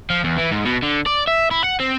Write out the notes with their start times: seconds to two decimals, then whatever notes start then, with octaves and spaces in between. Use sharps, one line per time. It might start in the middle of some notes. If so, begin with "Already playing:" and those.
0.10 F3
0.24 E2
0.38 E3
0.52 G#2
0.65 B2
0.83 D3
1.06 D5
1.27 E5
1.51 E4
1.64 F#5
1.80 C4